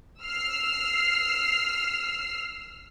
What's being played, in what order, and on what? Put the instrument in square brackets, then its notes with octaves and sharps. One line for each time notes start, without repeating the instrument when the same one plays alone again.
[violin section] E6 F6 C7